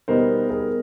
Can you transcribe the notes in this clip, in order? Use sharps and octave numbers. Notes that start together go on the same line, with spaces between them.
B2 G3 B3 D#4 A#4 C5
G#4 A#4